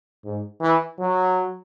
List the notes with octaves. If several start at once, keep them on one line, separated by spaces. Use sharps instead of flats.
G#2
E3
F#3